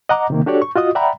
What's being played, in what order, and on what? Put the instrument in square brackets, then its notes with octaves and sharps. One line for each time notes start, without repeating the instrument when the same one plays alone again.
[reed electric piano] D#5 F#5 A#5 D6
C3 D#3 A#3
D4 F#4 G4 A4 C#5 D5
C#6
F4 F#4 D#5 D#6
D5 E5 F#5 G5 A#5 B5